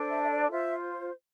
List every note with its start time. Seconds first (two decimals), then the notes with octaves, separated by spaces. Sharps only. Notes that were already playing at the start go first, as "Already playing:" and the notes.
Already playing: D4 A4 C5
0.09 E5
0.24 E5
0.30 D5
0.50 F4 C5 E5